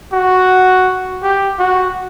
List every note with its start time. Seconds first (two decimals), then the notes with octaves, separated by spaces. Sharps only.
0.13 F#4
1.23 G4
1.59 F#4